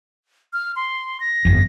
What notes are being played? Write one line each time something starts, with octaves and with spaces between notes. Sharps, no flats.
F6
C6
A#6
G1 F2